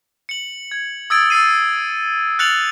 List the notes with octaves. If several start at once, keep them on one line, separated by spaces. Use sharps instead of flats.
C#7 F#7
G#6
D#6 E6 G#6 A6 D7
E6 A6 C7 D#7
F6 F#6 A6 C#7 F7 F#7